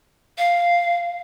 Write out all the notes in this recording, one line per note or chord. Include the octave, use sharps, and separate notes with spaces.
F5